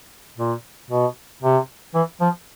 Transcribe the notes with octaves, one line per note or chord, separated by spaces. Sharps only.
A#2
B2
C3
E3
F3